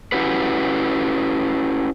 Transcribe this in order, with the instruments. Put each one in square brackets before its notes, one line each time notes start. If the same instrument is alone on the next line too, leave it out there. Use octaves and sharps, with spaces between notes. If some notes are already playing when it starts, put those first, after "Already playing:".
[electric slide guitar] C#4 E4 F#4 G4 B4